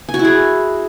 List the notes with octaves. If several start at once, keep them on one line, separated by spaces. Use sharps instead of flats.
G#5
F#4
E4
G#4